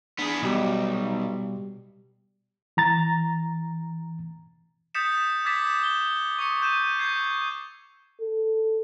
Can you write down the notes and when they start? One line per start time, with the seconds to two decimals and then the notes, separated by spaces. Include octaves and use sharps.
0.19 B3 D4 G#4
0.43 B1 B2 G3 G4
2.77 E3 A#5 A6
4.95 D#6 G6 A6 B6 C#7 E7
5.45 D6 E6 G#6 A6 B6 E7
5.83 G7
6.39 C#6 D#6 C#7
6.62 G6 D#7 E7
6.99 C#6 G6 G#6 C7
8.21 A4